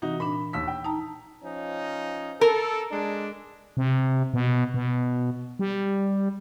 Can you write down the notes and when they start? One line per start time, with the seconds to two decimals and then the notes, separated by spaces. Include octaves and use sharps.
0.02 C3 E3 D#4 F#4
0.20 A#2 D4 B5
0.53 D#2 E6 B6
0.68 G5
0.85 D#4 A5 A#5
1.44 F3 C#4 D#4
2.41 A4 A#4
2.91 G#3 D4
3.77 C3
4.34 B2
4.74 B2
5.59 G3